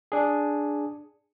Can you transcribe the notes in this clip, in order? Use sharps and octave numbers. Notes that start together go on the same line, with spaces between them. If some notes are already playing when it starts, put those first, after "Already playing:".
D4 G#4